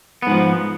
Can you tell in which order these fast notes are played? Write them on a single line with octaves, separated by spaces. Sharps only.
B3 G#2 F3